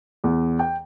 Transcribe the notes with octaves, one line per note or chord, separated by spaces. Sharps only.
E2
G5